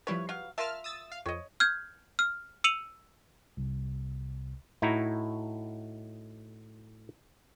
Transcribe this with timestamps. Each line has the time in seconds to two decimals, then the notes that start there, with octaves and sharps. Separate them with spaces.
0.07 F3 G3 E4 B4 C#5
0.29 F#3 F5
0.58 F4 A#4 E5 A5 F6
0.84 D#6 E6 A6
1.12 F5
1.26 F2 C#5 D#5
1.60 F6 G6 G#6
2.19 F6
2.64 E6 C#7 D#7 F7 F#7
3.57 C2 C3
4.82 A2 D#4 E4 F#4 A#5